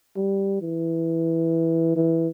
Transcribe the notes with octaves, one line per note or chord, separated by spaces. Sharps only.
G3
E3
E3